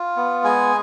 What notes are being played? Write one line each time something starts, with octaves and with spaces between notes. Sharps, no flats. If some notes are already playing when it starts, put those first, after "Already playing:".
Already playing: F4
B3
G#3 G#5